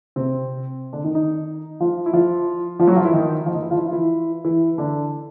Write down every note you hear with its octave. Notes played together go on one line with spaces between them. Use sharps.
C3 C4
D3 D4
D#3 D#4
D#3 D#4
F3 F4
E4
F3 F4
F3 F4
F#3 F#4
F3 F4
E3 E4
D#3 D#4
F3 F4
D#3 D#4
E3 E4
F3 F4
E4
F4
E3 E4
E3 E4
D3 D4